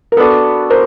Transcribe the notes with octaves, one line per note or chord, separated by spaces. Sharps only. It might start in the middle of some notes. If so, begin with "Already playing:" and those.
A#4
B3 D4 F#4 A4 B4
A#4 C5